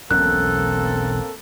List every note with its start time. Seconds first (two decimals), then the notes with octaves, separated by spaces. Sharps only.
0.11 E1 B1 A#3 C4 C#4 A4 F#6